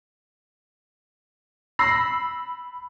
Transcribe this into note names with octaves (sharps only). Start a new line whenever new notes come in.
B5 E6 A#6 C7